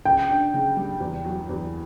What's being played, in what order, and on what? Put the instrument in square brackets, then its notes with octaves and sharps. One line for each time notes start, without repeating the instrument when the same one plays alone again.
[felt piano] C#3 [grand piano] G5
[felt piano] D4
C#3
G3
E2
F#3
E2